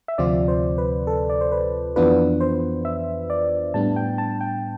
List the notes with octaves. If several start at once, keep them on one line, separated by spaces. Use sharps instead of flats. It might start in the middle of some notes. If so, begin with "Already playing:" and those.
E5
D2 C3 F3 C4 F4 D5
C5
B4
A4
D5
C5
B4
F2 E3 B3 D4 F4 B4
C5
E5
D5
A2 G3 B3 D4 A5
G5
A5
G5